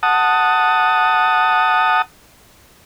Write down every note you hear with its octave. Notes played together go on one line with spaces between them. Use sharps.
F#5 A5 D#6